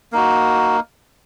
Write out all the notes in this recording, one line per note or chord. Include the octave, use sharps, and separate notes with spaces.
A#3 D#4 F#4